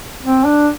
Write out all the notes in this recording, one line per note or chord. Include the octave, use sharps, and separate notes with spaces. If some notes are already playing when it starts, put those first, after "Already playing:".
C4
D4